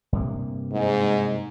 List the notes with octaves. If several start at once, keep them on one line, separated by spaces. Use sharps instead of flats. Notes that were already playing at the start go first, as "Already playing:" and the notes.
G2 C3 A#3
G#2